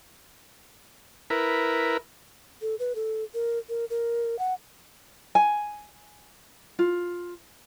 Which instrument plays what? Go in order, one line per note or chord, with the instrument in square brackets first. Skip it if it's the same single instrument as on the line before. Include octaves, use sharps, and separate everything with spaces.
[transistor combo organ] E4 A#4 B4
[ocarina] A4
B4
A4
A#4
A#4
A#4
F#5
[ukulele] G#5
F4